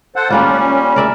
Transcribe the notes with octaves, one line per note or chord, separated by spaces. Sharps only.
A4 C5 F#5
G3 A#3 C#4 D4 F4
A#4 D5 E5